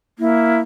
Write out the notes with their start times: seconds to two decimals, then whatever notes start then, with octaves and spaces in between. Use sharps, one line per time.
0.19 A#3 E4